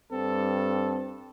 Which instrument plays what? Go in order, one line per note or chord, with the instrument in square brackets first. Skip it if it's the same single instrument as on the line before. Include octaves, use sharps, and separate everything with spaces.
[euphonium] G2 [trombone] C4 [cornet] A4